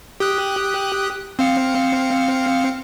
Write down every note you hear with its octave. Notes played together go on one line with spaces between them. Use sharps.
G4 D#6 F#6
C4 F5 C#7